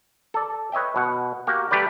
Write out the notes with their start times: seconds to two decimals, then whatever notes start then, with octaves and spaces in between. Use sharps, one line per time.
0.34 A4 D5
0.72 B4 C#5 D#5 E5 G5
0.96 B2 F#5
1.47 A#3 F#4 G4 A#4
1.71 G3 A3 G4 B4 D5